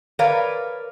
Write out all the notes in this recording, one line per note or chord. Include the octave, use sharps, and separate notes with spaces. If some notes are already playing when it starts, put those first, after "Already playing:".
A#4 B4 C#5 D5 F5